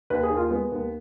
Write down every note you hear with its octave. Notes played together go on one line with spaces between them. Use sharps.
D#2 B4
G#4
D#2
F4
G#3 B3
D#2